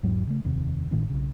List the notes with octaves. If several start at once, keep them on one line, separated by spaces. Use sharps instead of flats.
A#1 E2 G#2 F#3
C#3 A3
F1 D#2 C3
G#1 A2 D#3 C#4
B1 C#3